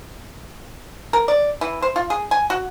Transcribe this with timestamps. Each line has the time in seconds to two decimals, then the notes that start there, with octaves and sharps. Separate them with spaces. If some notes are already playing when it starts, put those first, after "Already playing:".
1.13 A#4
1.28 D5
1.61 E3
1.82 C5
1.96 F4
2.10 G#4
2.31 G#5
2.50 F#4